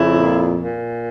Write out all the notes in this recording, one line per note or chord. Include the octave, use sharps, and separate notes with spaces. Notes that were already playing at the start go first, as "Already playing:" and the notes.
Already playing: F2 C#3 E4
A#2
A#2